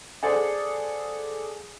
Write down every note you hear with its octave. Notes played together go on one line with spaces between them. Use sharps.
G#4 A4 C5 D5 F#5